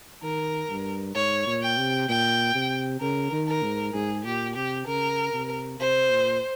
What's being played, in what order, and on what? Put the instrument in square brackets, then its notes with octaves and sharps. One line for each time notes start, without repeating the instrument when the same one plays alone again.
[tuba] D#3 [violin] A#4
[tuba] G2
[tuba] G#2 [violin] C#5
[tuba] A#2
[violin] G5
[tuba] C3
[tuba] A#2 [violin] G5
[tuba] C3
[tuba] C#3 [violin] A#4
[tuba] D#3
[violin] A#4
[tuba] G#2
[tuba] G#2 [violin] G#4
[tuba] A#2 [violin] G4
[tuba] C3 [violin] G4
[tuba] C#3 [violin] A#4
[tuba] C3
[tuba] C3 [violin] C5
[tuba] A#2